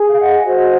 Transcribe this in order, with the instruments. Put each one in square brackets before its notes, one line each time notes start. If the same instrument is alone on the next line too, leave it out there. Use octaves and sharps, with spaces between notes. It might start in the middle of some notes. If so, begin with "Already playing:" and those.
Already playing: [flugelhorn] G#4
[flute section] F5
D#5 F#5
[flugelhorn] F#4 [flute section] C5 D#5